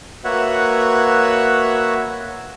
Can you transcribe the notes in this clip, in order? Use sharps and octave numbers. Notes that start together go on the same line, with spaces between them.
A#3 F#4 B4 C#5 E5 F#5